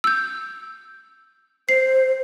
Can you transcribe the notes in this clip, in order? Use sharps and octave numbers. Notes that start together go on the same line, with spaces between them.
E6 G6
C5 C7